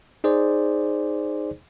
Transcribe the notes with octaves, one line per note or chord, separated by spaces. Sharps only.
D#4 G#4 C5 D5